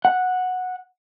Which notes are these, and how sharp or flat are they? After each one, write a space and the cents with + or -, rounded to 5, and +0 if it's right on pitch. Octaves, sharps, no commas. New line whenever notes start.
F#5 -10